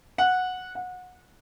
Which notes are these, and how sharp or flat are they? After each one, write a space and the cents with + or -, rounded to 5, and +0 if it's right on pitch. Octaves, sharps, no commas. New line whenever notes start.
F#5 -10
F#5 -25